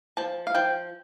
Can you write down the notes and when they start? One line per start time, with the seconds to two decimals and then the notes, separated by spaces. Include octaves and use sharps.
0.17 F3 A5
0.47 F5
0.55 F3 G5